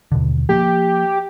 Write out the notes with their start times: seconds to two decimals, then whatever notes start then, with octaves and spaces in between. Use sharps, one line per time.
0.12 D#2 B2 D3
0.49 F3 A#3 G4